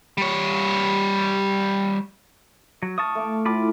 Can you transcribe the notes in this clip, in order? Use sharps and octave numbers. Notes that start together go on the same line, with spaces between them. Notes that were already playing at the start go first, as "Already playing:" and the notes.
G3 C#5
F#3
F5 A5 C#6 D#6
A3 D6
A2 F4 A5 B5 D6